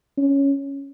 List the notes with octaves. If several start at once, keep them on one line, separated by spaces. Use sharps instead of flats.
C#4